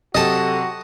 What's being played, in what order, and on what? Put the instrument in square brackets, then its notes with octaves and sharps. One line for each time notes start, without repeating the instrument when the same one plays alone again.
[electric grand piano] C3 F#3 [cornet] F#4 [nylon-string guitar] G4 A4 [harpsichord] D#5 A5